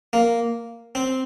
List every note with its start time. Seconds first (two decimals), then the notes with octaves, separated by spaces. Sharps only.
0.13 A#3
0.95 C4